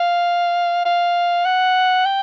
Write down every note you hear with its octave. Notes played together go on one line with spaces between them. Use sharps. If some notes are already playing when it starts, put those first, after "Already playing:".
Already playing: F5
F5
F#5
G5